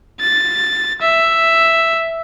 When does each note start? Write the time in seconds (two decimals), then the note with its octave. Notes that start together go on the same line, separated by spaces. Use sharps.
0.20 A6
1.02 E5